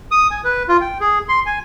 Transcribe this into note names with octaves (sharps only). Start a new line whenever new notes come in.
D#6
G#5
B4
F4
G5
G#4
C6
G#5